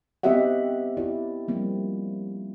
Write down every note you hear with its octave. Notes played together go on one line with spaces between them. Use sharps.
B3 C4 G4 D#5 E5 F#5
E4 G4 D5
F3 G3 A#3 C4